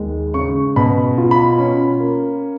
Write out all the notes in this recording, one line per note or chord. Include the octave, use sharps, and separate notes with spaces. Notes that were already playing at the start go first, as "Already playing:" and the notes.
Already playing: D#2 G#3
C#3 C#6
B2 B5
F4
B5
C#4
A#3